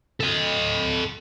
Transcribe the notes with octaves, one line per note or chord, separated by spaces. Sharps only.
A4 D#5